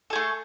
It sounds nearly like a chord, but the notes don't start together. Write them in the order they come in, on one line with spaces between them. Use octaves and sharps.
A4 G#4 A3